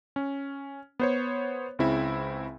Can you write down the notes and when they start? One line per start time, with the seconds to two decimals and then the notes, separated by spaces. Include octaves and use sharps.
0.16 C#4
1.00 B3 C5 C#5
1.79 C#2 C#3 C4 E4 E5